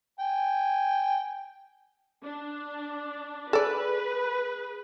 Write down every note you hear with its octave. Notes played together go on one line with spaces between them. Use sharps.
G5 G#5
D4
G#4 A4 B4 D5